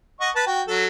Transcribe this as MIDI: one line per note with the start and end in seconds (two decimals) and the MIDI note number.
0.21 0.30 75
0.21 0.30 78
0.21 0.30 85
0.35 0.43 71
0.35 0.43 81
0.47 0.62 66
0.47 0.62 79
0.67 0.87 54
0.67 0.87 69